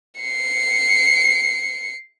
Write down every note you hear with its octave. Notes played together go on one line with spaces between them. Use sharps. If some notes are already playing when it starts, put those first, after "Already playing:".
C7 C#7